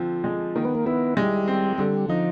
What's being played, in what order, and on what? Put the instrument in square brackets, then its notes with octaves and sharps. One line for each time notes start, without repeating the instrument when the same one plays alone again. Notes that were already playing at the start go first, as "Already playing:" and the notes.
Already playing: [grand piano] D3 F3 C4
G#3
[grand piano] D#3 [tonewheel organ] A#3
[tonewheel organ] B3
A#3
[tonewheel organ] B3 [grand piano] E4
[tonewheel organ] G3 [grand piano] G#3
[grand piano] C4
[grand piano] D3 [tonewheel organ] G3
[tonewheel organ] F3 [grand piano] D#4